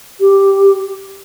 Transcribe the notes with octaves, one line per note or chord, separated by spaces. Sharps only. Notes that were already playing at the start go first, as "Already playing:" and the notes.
G4